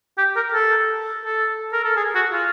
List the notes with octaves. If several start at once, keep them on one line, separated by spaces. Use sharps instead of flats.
G4
A#4
A4
A4
A#4
A4
G#4
F#4
F4